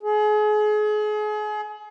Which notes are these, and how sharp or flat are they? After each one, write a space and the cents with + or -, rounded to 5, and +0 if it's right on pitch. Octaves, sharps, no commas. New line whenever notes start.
G#4 +35